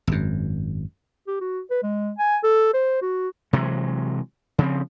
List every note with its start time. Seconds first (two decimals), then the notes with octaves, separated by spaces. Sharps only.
0.07 G#1 F#2
1.28 G4
1.41 F#4
1.71 B4
1.83 G#3
2.19 G#5
2.44 A4
2.74 C5
3.02 F#4
3.53 C3 E3 F#3 G#3
4.58 C#3 F3 C4